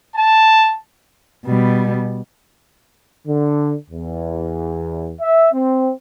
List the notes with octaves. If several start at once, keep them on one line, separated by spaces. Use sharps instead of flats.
A5
B2 G3
D3
E2
E5
C4